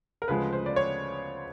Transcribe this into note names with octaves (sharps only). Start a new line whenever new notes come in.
A#4
D2 C#3 F3 G#3 B4
C5
D5
C#5